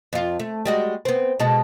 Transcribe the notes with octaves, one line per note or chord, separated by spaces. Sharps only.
F2 F4
A3
G3 G#3 F#4
B3 C4
B2 G#3 A4